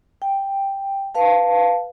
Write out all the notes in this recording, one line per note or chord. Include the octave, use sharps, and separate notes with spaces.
G5
B4 F5 A5